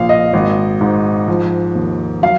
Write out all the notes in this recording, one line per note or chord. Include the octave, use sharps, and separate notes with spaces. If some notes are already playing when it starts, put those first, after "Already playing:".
Already playing: A#1 A#2 F5
D#5
G#1
G#2
F3
D#2
F#3 F5